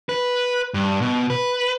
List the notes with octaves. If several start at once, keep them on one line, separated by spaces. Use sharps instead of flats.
B4
G2
B2
B4